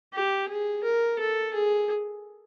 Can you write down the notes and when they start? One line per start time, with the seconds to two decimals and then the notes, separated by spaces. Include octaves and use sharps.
0.14 G4
0.49 G#4
0.84 A#4
1.20 A4
1.54 G#4